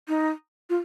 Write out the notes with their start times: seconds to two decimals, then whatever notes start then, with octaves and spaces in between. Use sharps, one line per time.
0.08 D#4
0.70 F4